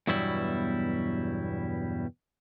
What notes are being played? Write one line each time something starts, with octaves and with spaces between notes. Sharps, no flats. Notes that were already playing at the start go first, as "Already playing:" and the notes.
E2 G2 B2 F#3 G3 E4